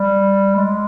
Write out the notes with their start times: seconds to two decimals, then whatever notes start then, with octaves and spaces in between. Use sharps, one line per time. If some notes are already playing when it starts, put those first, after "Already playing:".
Already playing: G3
0.56 G#3